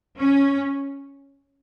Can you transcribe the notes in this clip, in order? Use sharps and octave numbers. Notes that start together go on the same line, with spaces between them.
C#4